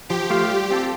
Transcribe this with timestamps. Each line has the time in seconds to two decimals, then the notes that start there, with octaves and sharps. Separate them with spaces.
0.10 F3 G4
0.30 A3 F4 C5 F5
0.50 G3
0.71 C4 F4 A4